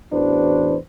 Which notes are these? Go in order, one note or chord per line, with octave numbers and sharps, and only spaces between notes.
A1 E2 D4 F#4 B4 C5